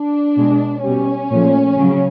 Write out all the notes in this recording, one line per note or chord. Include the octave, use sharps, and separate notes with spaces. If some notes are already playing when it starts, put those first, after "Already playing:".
Already playing: D4
B2 G#3
B2 G3 C#4
A#2 F3 A3
C#3 F#3